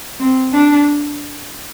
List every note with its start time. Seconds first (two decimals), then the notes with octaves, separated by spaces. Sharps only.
0.19 C4
0.52 D4